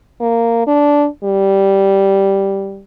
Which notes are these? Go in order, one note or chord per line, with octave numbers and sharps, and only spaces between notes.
A#3
D4
G3